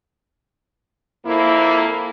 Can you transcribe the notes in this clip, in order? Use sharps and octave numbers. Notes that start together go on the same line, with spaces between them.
F2 A#3 E4